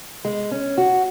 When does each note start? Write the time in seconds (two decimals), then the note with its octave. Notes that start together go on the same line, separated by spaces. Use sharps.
0.25 G#3
0.51 C#4
0.78 F#4